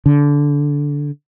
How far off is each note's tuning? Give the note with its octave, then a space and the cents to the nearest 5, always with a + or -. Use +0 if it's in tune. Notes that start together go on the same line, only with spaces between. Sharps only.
D3 -15